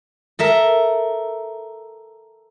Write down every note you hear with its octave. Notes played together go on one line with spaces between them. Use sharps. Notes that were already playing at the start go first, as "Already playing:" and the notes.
A4 A#4 E5